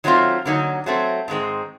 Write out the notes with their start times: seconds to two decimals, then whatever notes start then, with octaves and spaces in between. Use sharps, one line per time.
0.04 D#3 F#3 A3 C4 F4
0.45 D3 F#3 A#3 D#4
0.86 F#3 A3 C4
1.28 G#2 D#3 G#3 C4